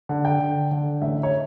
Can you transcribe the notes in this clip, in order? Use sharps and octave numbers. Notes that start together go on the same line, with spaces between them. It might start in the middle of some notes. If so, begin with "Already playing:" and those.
D3
G5
D3
D3
A1 E5
C#5